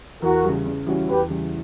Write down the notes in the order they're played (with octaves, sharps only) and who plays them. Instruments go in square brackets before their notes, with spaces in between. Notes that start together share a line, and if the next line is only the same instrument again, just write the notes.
[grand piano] E2 [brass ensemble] F#4 A#4
[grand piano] C#3 G3
C#3
E3 G3 C#4 F#4
[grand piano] E2 [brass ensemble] G4 B4
[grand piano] C#3 E3 G3